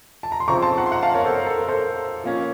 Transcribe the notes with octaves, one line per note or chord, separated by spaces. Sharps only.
A5
A#5
C6
C#3 F3 C4 A#5 C#6
A5 C6
F#5 A#5
C6
F#5 A#5
F5 A5
A#4 C#5
A4 C5
A#4
A4
A#4
A4 C5
F3 A#3 C#4